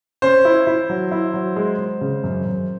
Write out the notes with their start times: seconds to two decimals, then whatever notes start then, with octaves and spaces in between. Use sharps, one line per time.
0.22 C#4 C5
0.45 E4
0.67 E4
0.89 F#3
1.12 E4
1.34 F#3
1.56 G#3
1.79 G#3
2.01 C#3
2.24 F#2
2.46 F#2